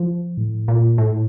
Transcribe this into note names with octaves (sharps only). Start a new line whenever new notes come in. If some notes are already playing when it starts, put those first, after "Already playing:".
Already playing: F3
A2
A#2
A2